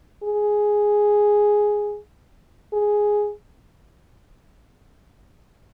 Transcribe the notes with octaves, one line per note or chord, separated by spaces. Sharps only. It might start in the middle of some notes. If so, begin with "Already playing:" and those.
G#4
G#4